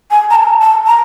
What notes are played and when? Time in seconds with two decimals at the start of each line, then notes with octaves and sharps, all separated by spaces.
0.10 G#5
0.30 A#5
0.35 A5
0.61 A5
0.87 A#5